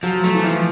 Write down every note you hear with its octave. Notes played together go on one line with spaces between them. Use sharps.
F3 F#3
A3
E3
F3